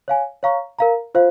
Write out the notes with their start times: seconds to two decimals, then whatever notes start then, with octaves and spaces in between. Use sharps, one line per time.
0.08 C#5 F5 G#5
0.43 C#5 F5 A#5 C#6
0.79 A#4 F5 A#5
1.15 F4 C5 F5